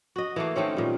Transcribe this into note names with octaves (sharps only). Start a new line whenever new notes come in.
F#4 D#5
E3 A3 A#3
D#3 A3 C4 C#4
A#2 G3